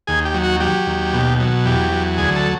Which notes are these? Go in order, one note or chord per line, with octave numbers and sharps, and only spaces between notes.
D#2 G#4
G4
F#3
F#4
F#3 G4
D#2
B2
F#3
E2 G4
F#3
D2 G#4
A4